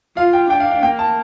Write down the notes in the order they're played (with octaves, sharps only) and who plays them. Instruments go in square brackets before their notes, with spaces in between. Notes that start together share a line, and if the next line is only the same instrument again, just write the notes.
[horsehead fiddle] F4 [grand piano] F5
[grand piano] G5
[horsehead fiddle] D4 [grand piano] G5
[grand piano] F5
F5
[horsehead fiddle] A#3 [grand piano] G5
[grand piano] A5